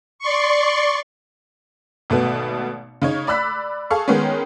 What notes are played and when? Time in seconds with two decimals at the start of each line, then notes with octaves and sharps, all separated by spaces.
0.19 D5 C6 C#6
2.10 G#1 B2 A3 B3
3.02 C#3 D#4 C#5
3.27 D5 B5 E6 F#6 B6
3.90 G#4 A4 F5 C#6
4.08 D#3 G#3 B3 C#4